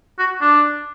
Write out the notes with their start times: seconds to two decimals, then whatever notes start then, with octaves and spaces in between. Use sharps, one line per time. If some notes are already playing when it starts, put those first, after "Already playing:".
0.19 F#4
0.41 D4